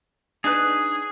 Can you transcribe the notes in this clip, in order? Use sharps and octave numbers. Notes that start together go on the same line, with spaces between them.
D4 D#4 G#4 B4